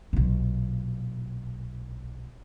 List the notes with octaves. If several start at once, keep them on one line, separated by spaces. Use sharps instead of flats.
B1 A#2